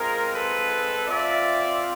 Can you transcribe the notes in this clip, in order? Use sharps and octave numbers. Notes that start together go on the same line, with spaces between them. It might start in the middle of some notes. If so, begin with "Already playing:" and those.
Already playing: G#3 C4 F4 G#4 A#4
A4 B4
C4 F4 D5 E5